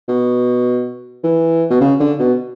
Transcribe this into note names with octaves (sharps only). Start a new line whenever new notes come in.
B2
E3
B2
C#3
D3
B2